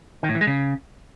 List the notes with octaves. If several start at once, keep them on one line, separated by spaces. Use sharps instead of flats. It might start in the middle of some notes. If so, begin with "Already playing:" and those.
D#3
A2
E3
G#3
C#3